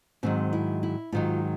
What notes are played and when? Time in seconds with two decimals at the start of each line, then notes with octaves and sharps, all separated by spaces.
0.23 G#2 D#3 F#3 C4
0.53 E4
0.83 E4
1.12 G#2 D#3 F#3 F4